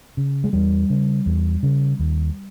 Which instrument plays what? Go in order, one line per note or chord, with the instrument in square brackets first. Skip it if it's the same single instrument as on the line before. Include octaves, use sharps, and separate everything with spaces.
[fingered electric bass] C#3
G#3
E2 G3
C#3
E2
C#3
D#2